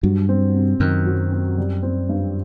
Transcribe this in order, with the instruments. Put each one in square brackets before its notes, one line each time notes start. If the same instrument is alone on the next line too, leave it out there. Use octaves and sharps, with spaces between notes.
[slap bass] G2 [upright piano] F#3
[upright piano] C4
C3
[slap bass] F#2 [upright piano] D#3
[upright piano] F#3
C4
G3
C4
G2